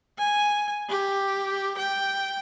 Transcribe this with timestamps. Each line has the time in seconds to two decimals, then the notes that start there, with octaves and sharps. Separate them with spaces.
0.18 G#5
0.89 G4
1.77 G5